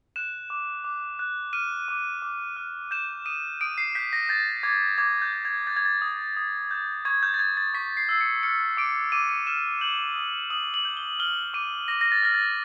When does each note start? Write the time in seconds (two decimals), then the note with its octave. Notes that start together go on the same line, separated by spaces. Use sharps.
0.16 F#6 E7
0.50 D6
0.84 D6
1.19 F#6
1.53 F6 D#7
1.88 D6
2.22 D6
2.56 F6
2.91 G6 E7
3.25 D#6 D#7
3.61 D#6 D7
3.78 C7
3.95 G6 B6
4.13 A#6
4.29 G6 A6
4.63 D6 G#6
4.98 D6 G#6
5.22 G6
5.33 G6
5.45 G#6
5.67 G6 A6
5.76 G#6
5.85 A6
6.02 D#6
6.37 D#6
6.71 G6
7.05 C#6 G#6
7.23 G6
7.34 A6
7.39 G6 G#6
7.57 A6
7.74 C#6 B6
7.97 C7
8.09 E6 C7
8.21 C#7
8.43 F6 C#7
8.77 D6 D7
9.12 D6 D#7
9.29 D#7
9.47 F6 E7
9.81 G6 F#7
10.15 D#6
10.50 D#6 F#7
10.74 F#7
10.85 G6
10.97 G7
11.19 F6 G7
11.54 D6 D#7
11.88 D6 A#6
12.01 A#6
12.12 A6
12.23 F6 A#6
12.34 A6